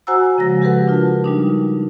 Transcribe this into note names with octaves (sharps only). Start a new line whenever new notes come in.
F#4 C5 F#5 G#5 A#5 E6
C#3 F3 G#3 A#6
F#4 G4 A4 B4 F#5
D4 F4 A#4 A5
G3 D4 D#4